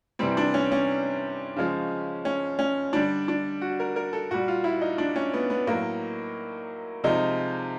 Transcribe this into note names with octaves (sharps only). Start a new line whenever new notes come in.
C3 E3 G3 C4
D4
C#4
C#4
C#3 F3 G#3
C#4
C#4
D3 G3 D4
D4
F#4
A#4
A#4
A4
A#2 G3 F#4
F4
E4
D#4
D4
C#4
B3
B3
A2 F#3 A#3
C3 F3 G#3 D#4